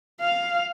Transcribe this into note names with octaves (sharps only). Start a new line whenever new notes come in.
F5